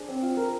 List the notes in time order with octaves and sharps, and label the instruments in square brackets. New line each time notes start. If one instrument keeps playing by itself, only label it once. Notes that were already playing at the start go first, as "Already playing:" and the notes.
Already playing: [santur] D4 G#4 C5
C4
F4
A#4